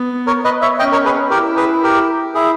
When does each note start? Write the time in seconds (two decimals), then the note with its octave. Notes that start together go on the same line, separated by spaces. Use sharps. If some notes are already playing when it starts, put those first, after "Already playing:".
Already playing: B3
0.27 A#4 C#5
0.44 B4 D#5
0.61 C#5 E5
0.79 C#4 D#5 G5
0.92 A#4 C#5
1.05 G#4 B4
1.30 E4 G4 A#4
1.57 G#4 B4
1.83 G4 A#4
2.35 E4 G#4